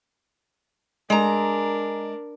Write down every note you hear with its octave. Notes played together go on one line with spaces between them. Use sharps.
G#3 D4 A#4 A#5